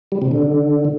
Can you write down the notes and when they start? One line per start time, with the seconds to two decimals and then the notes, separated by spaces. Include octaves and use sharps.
0.12 G3
0.22 C3
0.31 D3